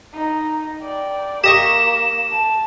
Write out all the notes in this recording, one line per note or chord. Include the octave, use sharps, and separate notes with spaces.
D#4
D5 G5
A#3 G4 D#5 C#6 E7
A5